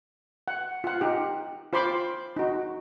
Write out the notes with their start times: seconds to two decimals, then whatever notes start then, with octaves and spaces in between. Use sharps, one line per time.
0.48 F#5
0.84 F4 F#5
1.01 D#4 G4
1.73 F4 C5 B5 C6 D6
2.36 D#4 F#4